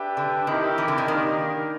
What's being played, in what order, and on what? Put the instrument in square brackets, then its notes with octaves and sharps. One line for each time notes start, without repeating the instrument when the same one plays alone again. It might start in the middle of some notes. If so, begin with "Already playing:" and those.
Already playing: [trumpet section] D4 G4 B4 E5 G5
[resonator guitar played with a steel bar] D3
[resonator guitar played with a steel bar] D#3 [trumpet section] C4 E4 G4 A#4
[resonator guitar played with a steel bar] E3
D3
D#3
[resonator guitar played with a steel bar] D#3 [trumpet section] A#3 D4 G4 A#4